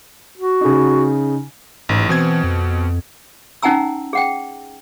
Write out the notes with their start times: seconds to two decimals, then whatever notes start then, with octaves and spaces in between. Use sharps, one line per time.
0.38 F#4
0.61 C#3 D#4
1.89 A1 G#2
2.09 B2 E3 C4 G#6
2.44 F2
3.63 C#4 D#4 F#5 G#5 A#5 E6
4.13 G#4 F#5 G5